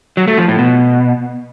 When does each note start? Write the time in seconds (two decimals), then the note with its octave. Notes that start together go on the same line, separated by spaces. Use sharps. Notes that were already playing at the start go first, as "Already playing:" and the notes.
0.17 F#3
0.28 A3
0.38 F3
0.48 A2
0.59 B2